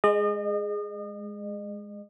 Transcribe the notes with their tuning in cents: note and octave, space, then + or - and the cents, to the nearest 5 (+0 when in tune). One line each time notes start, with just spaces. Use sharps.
G#3 +0 D#5 -35